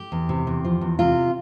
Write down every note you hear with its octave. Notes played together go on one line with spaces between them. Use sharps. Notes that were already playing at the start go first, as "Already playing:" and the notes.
Already playing: G4
E2
C3
E2
F3
E2
C3 F4